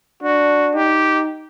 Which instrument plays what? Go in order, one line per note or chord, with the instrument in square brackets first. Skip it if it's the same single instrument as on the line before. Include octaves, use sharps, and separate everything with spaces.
[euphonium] D4 [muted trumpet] F#4
[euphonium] D#4 [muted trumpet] G4